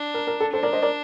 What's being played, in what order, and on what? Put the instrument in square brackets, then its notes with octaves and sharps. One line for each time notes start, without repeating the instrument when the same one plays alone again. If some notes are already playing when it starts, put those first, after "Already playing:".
Already playing: [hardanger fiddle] D4
[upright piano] A#4
A#4
A4
[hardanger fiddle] D4 [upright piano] A4 C5
[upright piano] A#4 D5
C5 D#5
A#4 D5